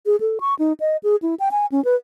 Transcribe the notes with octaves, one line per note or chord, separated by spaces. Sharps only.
G#4
A4
C#6
D#4
D#5
G#4
E4
G5
G#5
C#4
B4